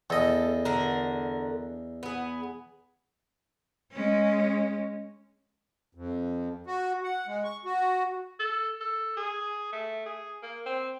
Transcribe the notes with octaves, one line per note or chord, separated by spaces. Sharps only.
E2 A4 D#5
D3 A#4
B3 G#4
G#3 C#4
F2
F#4
F#5
G#3
C#6
F#4
A4
A4
G#4
A3
G#4
A#3
C4